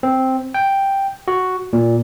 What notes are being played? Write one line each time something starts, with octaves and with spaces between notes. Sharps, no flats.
C4
G5
F#4
A#2